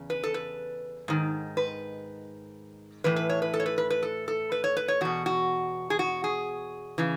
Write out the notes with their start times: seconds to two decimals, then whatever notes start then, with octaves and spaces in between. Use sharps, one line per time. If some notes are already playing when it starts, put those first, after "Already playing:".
Already playing: E2 C#3
0.10 B4
0.23 A4
0.34 B4
1.08 G#2 D#3
1.57 B4
3.04 A2 E3 B4
3.16 B4
3.29 C#5
3.42 B4
3.54 A4
3.60 C#5
3.66 B4
3.78 B4
3.90 B4
4.03 A4
4.28 A4
4.52 B4
4.64 C#5
4.77 B4
4.88 C#5
5.01 E2 B2 F#4
5.26 F#4
5.90 G#4
5.99 F#4
6.24 G#4
6.98 C#3 E3